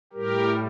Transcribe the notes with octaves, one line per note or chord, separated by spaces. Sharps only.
A2 G3 G4 A#4